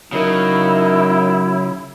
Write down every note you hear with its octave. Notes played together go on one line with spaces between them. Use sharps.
C#3 F#3 D#4 E4 A#4